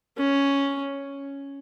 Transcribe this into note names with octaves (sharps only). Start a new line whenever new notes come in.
C#4